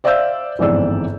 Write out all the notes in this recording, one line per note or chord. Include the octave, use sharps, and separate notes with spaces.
C5 D5 E5 F5 E6 G6
G1 F2 G#2 E3 D5 E6